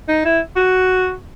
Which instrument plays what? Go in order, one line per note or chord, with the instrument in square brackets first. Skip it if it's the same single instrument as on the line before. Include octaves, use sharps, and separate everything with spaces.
[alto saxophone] D#4
E4
F#4